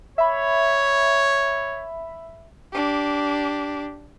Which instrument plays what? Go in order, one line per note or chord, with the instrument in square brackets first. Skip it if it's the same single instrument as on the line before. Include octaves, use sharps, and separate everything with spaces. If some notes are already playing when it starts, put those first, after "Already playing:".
[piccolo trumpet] C#5 [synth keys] E5 B5
[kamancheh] D4 G4